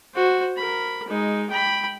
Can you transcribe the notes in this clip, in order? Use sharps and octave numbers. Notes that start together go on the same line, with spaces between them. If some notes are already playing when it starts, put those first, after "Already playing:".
F#4 C5
A#4 B5
G#3 D#4
G5 B5